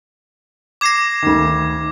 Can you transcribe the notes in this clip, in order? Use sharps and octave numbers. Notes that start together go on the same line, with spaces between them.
D6 G#6 A#6 C7 E7
D2 D#3